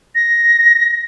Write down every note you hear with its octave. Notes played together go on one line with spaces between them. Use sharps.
A#6